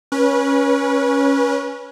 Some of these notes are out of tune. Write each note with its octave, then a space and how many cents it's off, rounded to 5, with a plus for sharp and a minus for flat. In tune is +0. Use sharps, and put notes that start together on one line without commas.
C#4 +0 B4 -30